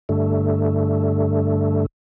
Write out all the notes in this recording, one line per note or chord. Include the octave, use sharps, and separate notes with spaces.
G2 D3 A3